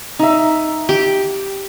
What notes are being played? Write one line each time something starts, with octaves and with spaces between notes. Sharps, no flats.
D#4 E5
G4